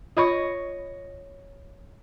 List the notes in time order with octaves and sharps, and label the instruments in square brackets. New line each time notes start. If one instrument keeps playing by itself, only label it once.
[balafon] F4 B5 C#6 [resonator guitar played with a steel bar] C#5 D#5